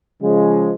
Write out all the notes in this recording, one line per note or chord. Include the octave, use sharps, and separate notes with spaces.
C#3 F3 G#3